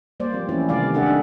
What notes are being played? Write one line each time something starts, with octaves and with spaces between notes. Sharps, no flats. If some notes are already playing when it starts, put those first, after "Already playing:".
G3 A#3 C5 D5
F3 C4
E3 F3 A3 C#4 E4
C3 D#3 G3 D5 F5
G#3 D4 G#4 A4 E5 F#5
D4 D#4